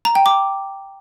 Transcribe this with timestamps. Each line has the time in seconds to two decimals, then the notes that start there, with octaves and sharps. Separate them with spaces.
0.05 A#5
0.15 G5
0.26 D6